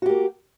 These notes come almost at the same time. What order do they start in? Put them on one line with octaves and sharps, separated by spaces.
F#4 G4 A#3